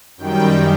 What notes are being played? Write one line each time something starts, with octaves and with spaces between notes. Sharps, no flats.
F#2 D#3 G3 G5